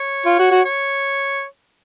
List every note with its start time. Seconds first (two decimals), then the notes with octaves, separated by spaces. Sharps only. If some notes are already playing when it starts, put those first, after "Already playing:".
Already playing: C#5
0.26 F4
0.39 F#4
0.51 F#4
0.65 C#5